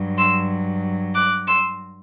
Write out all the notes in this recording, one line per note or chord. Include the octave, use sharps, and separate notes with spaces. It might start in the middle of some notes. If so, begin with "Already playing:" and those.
Already playing: G2 F#3
C6 E6
D6 F#6
C6 E6